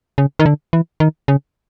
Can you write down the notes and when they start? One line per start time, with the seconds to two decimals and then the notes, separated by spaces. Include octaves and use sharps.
0.18 C#3
0.39 D#3
0.46 D3
0.73 E3
1.00 D#3
1.28 C#3